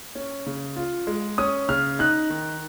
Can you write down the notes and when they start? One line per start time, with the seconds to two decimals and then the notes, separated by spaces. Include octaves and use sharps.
0.15 C#4
0.46 C#3
0.76 F4
1.07 G#3
1.38 C#4 D#6
1.69 C#3 F6
1.99 D#4 F#6
2.30 D#3